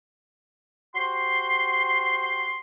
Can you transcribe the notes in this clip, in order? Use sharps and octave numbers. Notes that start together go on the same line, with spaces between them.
F#4 G4 C5 C6